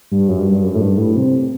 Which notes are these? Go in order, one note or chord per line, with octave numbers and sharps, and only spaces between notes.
G2
F#2
G2
G2
F#2
A2
G2
A2
C3